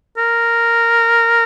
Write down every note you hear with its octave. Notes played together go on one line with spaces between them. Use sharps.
A#4